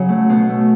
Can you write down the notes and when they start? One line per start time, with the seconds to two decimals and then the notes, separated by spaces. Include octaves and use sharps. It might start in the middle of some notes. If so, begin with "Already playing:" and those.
Already playing: C#3 F#3 G#4
0.09 A3
0.30 B2
0.49 A3